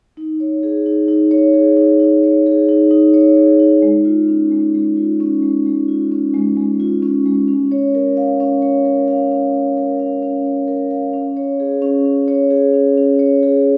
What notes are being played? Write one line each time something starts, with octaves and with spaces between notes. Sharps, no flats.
D#4
C#5
G#4
D#4
D#4
C#5
G#4
D#4
D#4
C#5
G#4
D#4
D#4
C#5
G#4
D#4
G#3
F4
C#4
G#3
G#3
F4
C#4
G#3
G#3
F4
C#4
G#3
G#3
F4
C#4
G#3
C#4
C#5
A#4
F5
C#4
C#5
A#4
F5
C#4
C#5
A#4
F5
C#4
C#5
A#4
F5
C#4
C#5
G#4
C#4
C#4
C#5
G#4
C#4
C#4
C#5
G#4